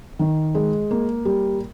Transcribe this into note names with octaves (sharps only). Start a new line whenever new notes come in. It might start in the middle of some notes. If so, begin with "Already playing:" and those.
D#3
G#3
A#3
G3